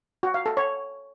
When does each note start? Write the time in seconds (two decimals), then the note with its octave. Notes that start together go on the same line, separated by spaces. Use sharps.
0.23 F#4
0.34 F5
0.46 A4
0.57 C#5